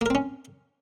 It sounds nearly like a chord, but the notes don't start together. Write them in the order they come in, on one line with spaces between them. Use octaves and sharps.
A#3 A#4 C4 C#4